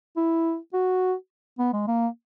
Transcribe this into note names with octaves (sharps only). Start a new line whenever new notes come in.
E4
F#4
B3
G#3
A#3